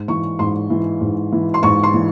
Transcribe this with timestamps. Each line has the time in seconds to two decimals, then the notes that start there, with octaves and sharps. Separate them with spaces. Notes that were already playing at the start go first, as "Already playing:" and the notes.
Already playing: G#2
0.08 E3 C#6
0.39 G#2 C6
0.70 E3
1.01 G#2
1.32 E3
1.54 C6
1.63 G#2 C#6
1.83 C6
1.94 E3